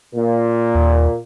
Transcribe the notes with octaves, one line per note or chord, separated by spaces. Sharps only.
A#2
D#2